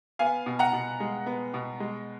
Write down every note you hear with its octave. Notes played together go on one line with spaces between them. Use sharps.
B3 F5 G#5
B2
F#5 A#5
B2
G#3
B3
B2
G#3